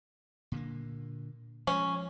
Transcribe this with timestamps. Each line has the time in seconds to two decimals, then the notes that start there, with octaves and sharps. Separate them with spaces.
0.52 A#2 D3 A#3
1.67 F3 G#3 C#4